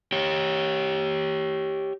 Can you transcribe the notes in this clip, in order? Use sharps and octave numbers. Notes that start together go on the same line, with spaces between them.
G4 C#5